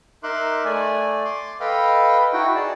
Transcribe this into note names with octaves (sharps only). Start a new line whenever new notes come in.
D#4 A#4 E5 C6 D6 F#6
A3 D5 G#5
C6 D6
A4 B4 D#5 F5 G5 B5
D#4 E4 F#4 F#5 G5
G#4 D5 A5